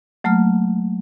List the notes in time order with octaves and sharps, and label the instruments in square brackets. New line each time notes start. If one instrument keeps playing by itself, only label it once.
[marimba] F#3 A3 A#3 F6